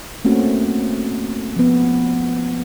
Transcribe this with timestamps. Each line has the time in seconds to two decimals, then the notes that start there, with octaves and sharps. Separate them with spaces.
0.25 A3 A#3 C4 C#4 F#4
1.56 F3 B3